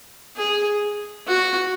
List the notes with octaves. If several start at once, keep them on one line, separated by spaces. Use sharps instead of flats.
G#4
F#4